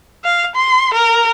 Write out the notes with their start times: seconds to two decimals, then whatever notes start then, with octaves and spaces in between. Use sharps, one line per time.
0.24 F5
0.55 C6
0.94 A#4